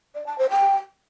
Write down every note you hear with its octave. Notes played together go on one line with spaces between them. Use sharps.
D5
A5
C5
G5